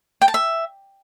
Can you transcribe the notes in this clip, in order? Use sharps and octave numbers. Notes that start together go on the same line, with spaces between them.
G5
A5
E5